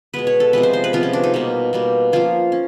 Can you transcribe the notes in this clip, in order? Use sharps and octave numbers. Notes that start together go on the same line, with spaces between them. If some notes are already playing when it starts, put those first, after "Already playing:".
B2 G#3 B3 B4
C#5
A4
C3 F3 G#3 B3 B4
C5
C5
B4
C3 F3 G#3 B3 F4
C#4
D4
D#4
B2 G3 A#3
B2 G3 A#3
F3 A#3 C#4 F4
C#4